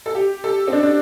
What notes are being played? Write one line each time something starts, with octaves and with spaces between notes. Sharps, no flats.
A4
G4
A4
C4
D4
D4